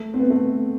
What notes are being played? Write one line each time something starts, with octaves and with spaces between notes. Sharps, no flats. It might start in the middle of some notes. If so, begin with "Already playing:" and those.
Already playing: A3
C4
B3
A3